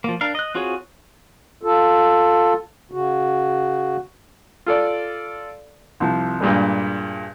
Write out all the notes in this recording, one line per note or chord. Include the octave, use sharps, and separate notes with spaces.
F3 A#3
D4 A#4 F5
D#5 F#6
C4 F4 F#4 G#4 C#5
F4 A4
C#3 F#4
F4 A4 D5
C2 C3 F3
G2 A#2 G3 G#3